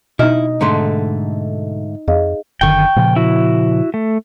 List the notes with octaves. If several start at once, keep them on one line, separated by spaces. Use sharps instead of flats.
B2 D#4 E4 D#5 F6
G#2 D3 A3 A#5 C6
F2 G#4 D#5 F5
F#1 D3 D#3 G5 C#6
A#2 C#3 F3
E4 F#4
A3